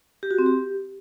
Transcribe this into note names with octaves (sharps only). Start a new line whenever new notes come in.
G4
F#4
C4
G4